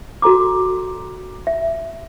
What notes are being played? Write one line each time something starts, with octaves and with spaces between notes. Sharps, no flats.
F#4 A4 A#5 D6
E5